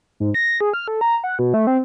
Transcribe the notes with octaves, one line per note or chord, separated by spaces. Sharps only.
G#2
A#6
G#4
F6
A4
A#5
F#5
B2
A3
C4